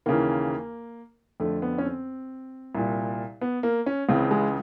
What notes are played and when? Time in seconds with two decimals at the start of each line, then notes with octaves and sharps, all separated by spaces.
0.06 D#2 C#3 E3 A#3
1.40 F2 D3 A3
1.62 B3
1.78 C#4
1.85 C4
2.75 C2 A#2
3.41 B3
3.63 A#3
3.86 C#4
4.09 C#2 C#3 E3 C4
4.31 G#3